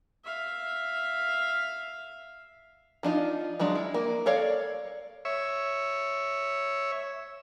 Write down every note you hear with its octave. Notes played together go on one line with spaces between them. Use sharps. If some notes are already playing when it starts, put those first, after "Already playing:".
E5 F5
F3 D4 D#4 F4
F3 F#3 G#3 D4
E4
A#3
A4 A#4 C#5 D5 F5
C#5 E5